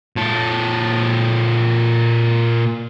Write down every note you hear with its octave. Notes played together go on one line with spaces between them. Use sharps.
A#2 A4